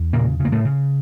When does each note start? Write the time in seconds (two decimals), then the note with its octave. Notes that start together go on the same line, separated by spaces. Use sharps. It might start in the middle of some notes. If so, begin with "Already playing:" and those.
Already playing: E2
0.13 A#2 C#3 A#3
0.39 C#3
0.45 A#3
0.52 A2 A3
0.65 C#3